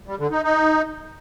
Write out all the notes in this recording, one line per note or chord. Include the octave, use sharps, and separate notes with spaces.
G3
D3
D#4
D#4